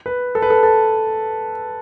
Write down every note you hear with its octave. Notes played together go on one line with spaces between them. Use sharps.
B4
A4
B4
A4
A4